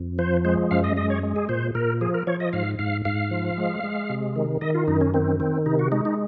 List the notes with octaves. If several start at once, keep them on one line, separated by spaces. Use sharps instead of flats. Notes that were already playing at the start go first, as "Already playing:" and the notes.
Already playing: F2
F3 C5
G#3 C5
F#2 F5
D#5
G#3 D#5
C#5
G#3
G#4
A#2 C5
A#2 A#4
F3 G#4
A#4
F3 C#5
D#5
G#2 F5
G#2 F5
G#2 F5
F3
G#3
G#3
C3
D#3
D#3 D#5
F4
F#2 D#4
C#4
D#3 C4
D#3 C4
C3 D#4
F#4
G#3 D#4
D#4